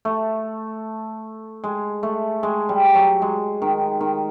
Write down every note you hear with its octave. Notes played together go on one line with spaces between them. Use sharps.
A3
G#3
A3
G#3
G3
F#3
G#3
D#3
D#3